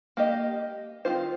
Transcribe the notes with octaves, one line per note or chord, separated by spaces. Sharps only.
A#3 G4 D#5
D#3 C4 F4 C5